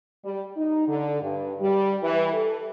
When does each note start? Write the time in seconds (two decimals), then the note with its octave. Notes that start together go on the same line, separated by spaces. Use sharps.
0.25 G3
0.57 D#4
0.88 D3
1.22 G2
1.61 G3
2.03 E3
2.33 A4